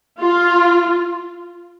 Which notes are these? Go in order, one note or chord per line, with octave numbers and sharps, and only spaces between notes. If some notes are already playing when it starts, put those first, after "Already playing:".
F4